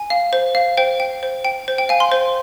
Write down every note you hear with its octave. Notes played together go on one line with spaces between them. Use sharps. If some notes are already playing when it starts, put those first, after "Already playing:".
Already playing: G#5
F5
C5
F5
C5 G5
G5
C5
G5
C5
G5
F5 G#5
C6
C5